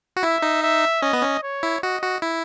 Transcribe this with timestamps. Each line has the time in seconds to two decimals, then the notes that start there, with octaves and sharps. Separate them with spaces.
0.17 F#4
0.23 E4 E5
0.42 D#4
0.63 E5
1.02 C#4 D#5
1.13 B3
1.23 C#4
1.43 C#5
1.63 E4
1.83 F#4 D#5
2.03 F#4
2.22 E4